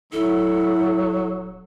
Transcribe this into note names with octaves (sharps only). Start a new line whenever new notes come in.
D#1 F#3 E4 A4 F#5